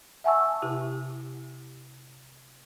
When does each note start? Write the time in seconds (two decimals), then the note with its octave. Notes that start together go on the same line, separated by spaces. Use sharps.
0.24 E5 F#5 G#5 A5 C#6 E6
0.62 C3 E4 G4